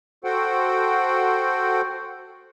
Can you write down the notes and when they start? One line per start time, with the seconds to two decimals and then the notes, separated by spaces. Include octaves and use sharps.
0.24 F#4 A4 C5 F#5 G5